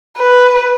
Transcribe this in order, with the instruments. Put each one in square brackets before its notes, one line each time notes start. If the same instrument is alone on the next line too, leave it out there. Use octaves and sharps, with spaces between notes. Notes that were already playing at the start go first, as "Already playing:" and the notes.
[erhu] B4